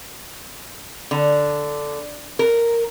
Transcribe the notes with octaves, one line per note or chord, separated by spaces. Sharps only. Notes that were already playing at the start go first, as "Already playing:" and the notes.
D3
A#4